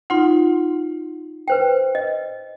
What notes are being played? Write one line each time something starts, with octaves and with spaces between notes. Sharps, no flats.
D#4 F4 F#5 C6
B4 C5 G5
D#5